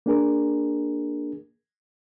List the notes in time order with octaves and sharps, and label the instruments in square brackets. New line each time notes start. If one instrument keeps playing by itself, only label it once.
[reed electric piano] A#3 D4 G#4 A#4